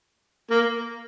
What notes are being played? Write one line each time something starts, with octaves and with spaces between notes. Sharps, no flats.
A#3